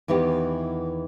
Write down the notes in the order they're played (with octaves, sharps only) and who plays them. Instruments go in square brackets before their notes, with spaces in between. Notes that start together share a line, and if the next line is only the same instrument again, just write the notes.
[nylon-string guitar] E2 D#3 E3 B3 G4